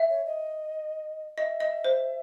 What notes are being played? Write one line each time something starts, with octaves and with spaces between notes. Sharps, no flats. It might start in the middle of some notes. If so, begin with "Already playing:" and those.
Already playing: E5
C#5
D#5
D#5 E5
D#5
C5